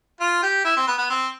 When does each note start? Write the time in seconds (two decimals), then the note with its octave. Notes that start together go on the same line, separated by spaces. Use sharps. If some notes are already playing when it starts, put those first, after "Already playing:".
0.20 F4
0.43 G4
0.65 E4
0.77 C4
0.87 B3
0.98 B3
1.10 C4